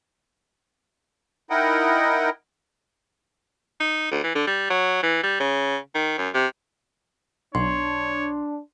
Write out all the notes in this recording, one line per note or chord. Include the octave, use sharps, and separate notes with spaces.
D#4 E4 A#4 D#5 F#5 G5
D#4
D2
E3
D3
G3
F#3
E3
G3
C#3
D#3
F#2
C3
B1 D4 C#5 C6